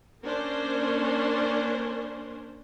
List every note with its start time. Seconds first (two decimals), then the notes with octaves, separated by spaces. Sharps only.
0.22 A#3 C#4 D4 A#4 C5